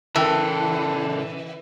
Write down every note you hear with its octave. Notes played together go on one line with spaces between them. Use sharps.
C#3 E3 A4 A#4 G5 A5